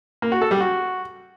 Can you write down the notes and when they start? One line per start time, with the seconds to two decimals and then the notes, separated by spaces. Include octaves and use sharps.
0.22 A#3
0.32 F#4
0.41 A4
0.51 G3
0.61 F#4